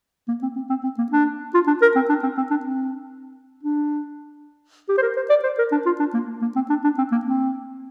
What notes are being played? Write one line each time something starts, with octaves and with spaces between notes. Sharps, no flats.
A#3
C4
C4
C4
C4
A#3
D4
F4
D4
A#4
C4
D4
C4
C4
D4
C4
D4
G4
C5
A#4
C5
D5
C5
A#4
D4
F4
D4
A#3
A#3
C4
D4
D4
C4
A#3
C4